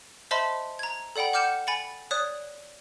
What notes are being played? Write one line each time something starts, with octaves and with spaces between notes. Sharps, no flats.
C5 D#5 E5 A5 B5 C6
A#5 G#6
A4 D5 F#5 G5 B5
F#5 D6 F6 G6 C#7 E7
G#5 B5 A6 C#7
C#5 D5 D#6 F#6